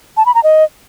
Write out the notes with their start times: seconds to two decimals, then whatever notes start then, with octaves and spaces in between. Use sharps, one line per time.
0.17 A5
0.26 B5
0.35 A#5
0.43 D#5